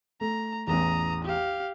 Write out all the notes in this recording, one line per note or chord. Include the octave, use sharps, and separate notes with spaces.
A3 A#5
A1 E2 A#5 D#6
G4 F5